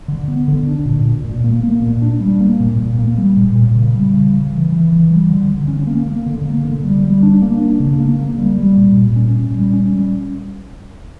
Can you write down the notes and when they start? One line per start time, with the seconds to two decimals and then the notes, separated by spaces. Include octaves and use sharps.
0.08 D3
0.28 B3
0.48 D3
0.67 D4
0.85 A#2
1.05 A#2
1.25 A#2
1.44 A#3
1.63 A#3
1.82 A#2
2.02 D4
2.20 G3
2.40 A#3
2.60 A#2
2.79 A#2
2.98 A#3
3.18 G3
3.37 A#2
3.56 A#2
3.75 C#3
3.94 G3
4.13 C#3
4.33 C#3
4.52 E3
4.72 E3
4.91 E3
5.10 G3
5.30 D3
5.49 D3
5.68 C#4
5.87 A#3
6.07 A#3
6.26 D3
6.45 A#3
6.65 D3
6.84 G3
7.04 G3
7.23 D4
7.42 A#3
7.61 D4
7.80 C#3
8.00 A#3
8.19 A#3
8.38 G3
8.58 G3
8.77 A#2
8.97 A#2
9.16 C#4
9.35 A#2
9.54 G3
9.73 C#4
9.92 G3